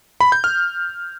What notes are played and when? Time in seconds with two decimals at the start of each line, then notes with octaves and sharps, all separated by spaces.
0.21 B5
0.32 G6
0.44 F6